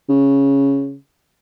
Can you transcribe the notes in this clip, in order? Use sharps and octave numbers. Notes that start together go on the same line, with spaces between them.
C#3